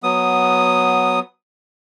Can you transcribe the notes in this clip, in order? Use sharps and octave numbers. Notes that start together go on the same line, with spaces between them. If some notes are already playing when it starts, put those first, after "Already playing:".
F#3 B3 D#6